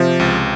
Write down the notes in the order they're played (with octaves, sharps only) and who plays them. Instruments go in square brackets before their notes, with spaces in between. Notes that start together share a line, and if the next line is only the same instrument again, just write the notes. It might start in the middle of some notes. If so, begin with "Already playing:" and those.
Already playing: [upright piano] C3 [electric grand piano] F3
[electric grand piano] C#2